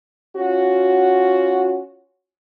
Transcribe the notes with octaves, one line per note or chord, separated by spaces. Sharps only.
C#4 F4 F#4